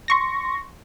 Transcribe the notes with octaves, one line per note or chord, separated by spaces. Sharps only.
C6 C#6 A#6